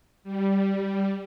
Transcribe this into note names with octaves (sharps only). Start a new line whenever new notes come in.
G3